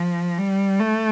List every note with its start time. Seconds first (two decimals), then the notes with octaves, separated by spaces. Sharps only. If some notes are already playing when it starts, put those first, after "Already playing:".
Already playing: F3
0.38 G3
0.80 A3